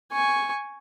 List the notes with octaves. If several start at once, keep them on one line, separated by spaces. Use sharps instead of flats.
G#5 C#6